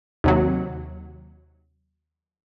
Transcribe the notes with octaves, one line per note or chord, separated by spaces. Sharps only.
D#2 C3 F#3